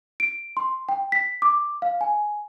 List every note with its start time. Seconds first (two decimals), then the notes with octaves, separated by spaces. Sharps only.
0.20 D7
0.57 C6
0.89 G5
1.12 B6
1.42 D6
1.82 F5
2.01 G#5